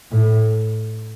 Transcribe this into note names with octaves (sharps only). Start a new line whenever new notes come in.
A2